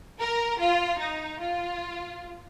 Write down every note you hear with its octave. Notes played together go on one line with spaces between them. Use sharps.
A#4
F4
D#4
F4